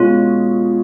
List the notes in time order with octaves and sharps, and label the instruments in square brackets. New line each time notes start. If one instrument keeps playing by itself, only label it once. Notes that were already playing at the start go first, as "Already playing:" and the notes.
Already playing: [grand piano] B2 G#3 C#4 [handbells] F4